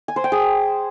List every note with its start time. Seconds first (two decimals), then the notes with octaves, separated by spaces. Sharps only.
0.08 G#5
0.16 C5
0.24 G5
0.32 G#4